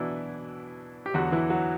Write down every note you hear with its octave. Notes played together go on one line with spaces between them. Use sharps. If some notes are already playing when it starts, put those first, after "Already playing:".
Already playing: B2 E3 F#3 D4 E4
G4
E2 D3 F#3 F#4
E3 E4
F#3 F#4